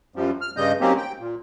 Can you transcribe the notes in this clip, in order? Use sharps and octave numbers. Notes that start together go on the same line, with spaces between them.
F#2 F3 G3
F6
G2 C#3 G3 D#5 G6
F#3 A#3 C4 C#4 D#4 G4
G5
A#2